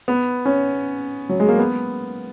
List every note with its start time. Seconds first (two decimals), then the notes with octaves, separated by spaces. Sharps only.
0.08 B3
0.45 C#4
1.29 F#3
1.40 G#3
1.49 A#3
1.58 B3